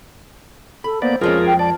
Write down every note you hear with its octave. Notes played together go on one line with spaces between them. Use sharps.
A4 B5
A#3 B3 C5 D5
F2 F3 G#3 C#4 F4 G#4 A#4
G5
D5 A5